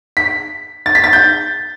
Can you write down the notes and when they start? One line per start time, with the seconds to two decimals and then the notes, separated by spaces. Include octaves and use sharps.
0.17 B6
0.86 A6
0.95 B6
1.04 A6
1.13 G6